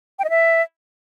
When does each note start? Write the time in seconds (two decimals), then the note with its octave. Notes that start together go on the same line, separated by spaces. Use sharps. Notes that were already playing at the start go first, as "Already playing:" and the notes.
0.19 G5
0.24 D#5
0.30 E5